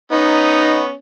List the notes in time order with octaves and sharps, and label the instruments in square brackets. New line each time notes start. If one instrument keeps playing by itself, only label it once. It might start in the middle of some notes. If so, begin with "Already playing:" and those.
[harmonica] B3 C#4 [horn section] D#4